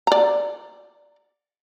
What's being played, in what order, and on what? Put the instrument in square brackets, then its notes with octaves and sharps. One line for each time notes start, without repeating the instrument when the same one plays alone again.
[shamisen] D5 A#5